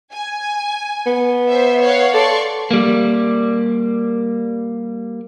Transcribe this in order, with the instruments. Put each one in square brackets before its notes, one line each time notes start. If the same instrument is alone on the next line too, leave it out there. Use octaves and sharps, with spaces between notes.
[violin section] G#5
[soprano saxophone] B3
[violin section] C5 E5
C#5 F5 F#5
[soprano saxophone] A4 [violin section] D5 C6 C#6
[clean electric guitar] G3 A#3